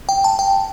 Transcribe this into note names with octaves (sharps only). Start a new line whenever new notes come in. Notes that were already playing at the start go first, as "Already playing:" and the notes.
G5
A5
G5